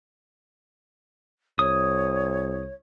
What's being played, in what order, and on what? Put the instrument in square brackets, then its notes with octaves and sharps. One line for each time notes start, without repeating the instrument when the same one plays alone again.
[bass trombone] C2 [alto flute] C#5 [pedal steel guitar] D#6